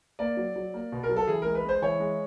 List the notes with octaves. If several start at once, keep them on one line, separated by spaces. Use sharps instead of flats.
A#3 D5
F#3
F#3
A#3
B2
A#4
F#3
A4
E3 G#4
G#3 A#4
B4
G#3 C5
E3 C#5
G#3